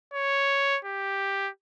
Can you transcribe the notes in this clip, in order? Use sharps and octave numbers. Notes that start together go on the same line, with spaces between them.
C#5
G4